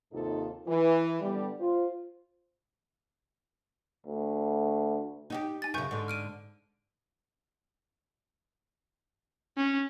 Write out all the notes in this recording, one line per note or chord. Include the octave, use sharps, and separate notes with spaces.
D#2 G#2 C3 D#4 F4 A4
E3
D3 G3 B3
F4 C5
D2
D#4 F#4 G4
G#5 A6
F#2 C#3 G#5 C#6 G6
G#2 D3
F6 D7 D#7
C#4